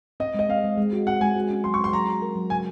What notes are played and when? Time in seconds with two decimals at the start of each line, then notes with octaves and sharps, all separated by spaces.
0.20 C4 D#5
0.34 G#3 D#5
0.49 C4 F5
0.64 G#3
0.78 G#3
0.93 F#4
1.07 C4 F#5
1.21 G#3 G#5
1.36 F#4
1.50 C#4
1.64 F#3 C6
1.74 C#6
1.79 C#4
1.84 C6
1.93 F#3 A#5
2.07 F#4
2.22 A#4
2.36 F#3
2.50 C#3 G#5